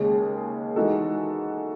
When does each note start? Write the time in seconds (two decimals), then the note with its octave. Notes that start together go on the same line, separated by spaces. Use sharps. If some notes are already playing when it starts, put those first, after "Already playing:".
Already playing: D#2 C#3 G#3
0.76 E3 G#3 D#4 F#4 A4